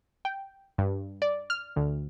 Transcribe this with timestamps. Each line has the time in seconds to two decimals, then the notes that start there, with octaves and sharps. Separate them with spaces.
0.25 G5
0.78 G2
1.22 D5
1.50 F6
1.76 D2